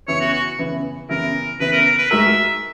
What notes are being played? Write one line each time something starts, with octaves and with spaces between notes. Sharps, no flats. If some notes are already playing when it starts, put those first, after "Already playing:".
C#3 E3 B3 E4 C#5
F#4
F#4
C#3 E3 B3 E4
C#3 E3 B3 E4 A#4
C#3 E3 B3 E4 B4
A#4
A#4
B4
G#3 D#4 F#4 A#4 E5